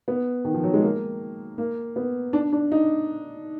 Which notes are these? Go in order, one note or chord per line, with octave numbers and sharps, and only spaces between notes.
B3
D#3
F3
F#3
G#3
A#3
A#3
B3
D4
D4
D#4